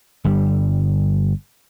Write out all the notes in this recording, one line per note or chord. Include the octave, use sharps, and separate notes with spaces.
G1 G2 G3